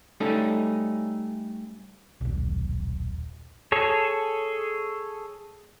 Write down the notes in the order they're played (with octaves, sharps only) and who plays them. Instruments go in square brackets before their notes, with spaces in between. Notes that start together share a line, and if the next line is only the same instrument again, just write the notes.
[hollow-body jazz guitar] G3 A3 C#4 D#4 A4
[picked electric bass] D#1 B1
[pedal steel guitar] G#4 A4 C#5